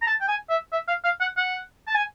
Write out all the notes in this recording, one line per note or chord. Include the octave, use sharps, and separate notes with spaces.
A#5
A5
G5
G#5
E5
E5
F5
F5
F#5
F#5
A5
G#5